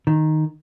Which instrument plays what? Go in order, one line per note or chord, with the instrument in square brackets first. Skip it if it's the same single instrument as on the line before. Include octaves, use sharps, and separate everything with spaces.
[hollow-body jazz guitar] D#3